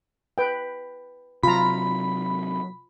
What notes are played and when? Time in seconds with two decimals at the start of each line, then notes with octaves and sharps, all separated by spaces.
0.38 B4 G5
1.43 C3 F#3 F4 A#5 B5